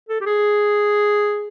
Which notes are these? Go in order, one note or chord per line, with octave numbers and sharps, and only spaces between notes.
A4
G4
G#4